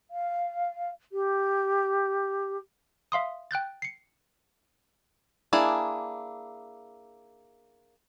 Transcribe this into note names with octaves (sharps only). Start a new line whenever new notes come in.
F5
G4
E5 F5 C6 D#6
G5 F#6 G6 A6
C7 C#7
A#3 D4 E4 G#4